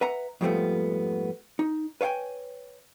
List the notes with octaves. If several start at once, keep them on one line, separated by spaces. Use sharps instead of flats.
B4 E5 F#5 A#5
F2 G#2 F3 G3 A3 B3
D#4
B4 C#5 F5 G5 G#5